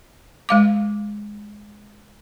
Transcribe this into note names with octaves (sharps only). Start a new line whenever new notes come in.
G#3 F5 D6